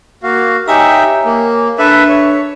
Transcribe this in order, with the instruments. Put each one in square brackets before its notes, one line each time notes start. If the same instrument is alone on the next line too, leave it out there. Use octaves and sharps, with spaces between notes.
[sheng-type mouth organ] A#3 F#4 F5
[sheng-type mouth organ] D#4 G4 E5 [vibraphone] C#5 G#5 A#5
[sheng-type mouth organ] A#3
[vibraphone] D4 [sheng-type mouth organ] A4 B4 E5
[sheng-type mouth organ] C#5